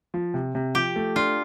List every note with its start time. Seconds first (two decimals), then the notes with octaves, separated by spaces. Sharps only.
0.14 F3
0.34 C3
0.55 C3
0.75 F3 G4
0.96 A3
1.16 D4 F4